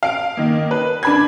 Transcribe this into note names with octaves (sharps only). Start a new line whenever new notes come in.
F5 D7
D#3 A#3
B4
D4 B5 G#6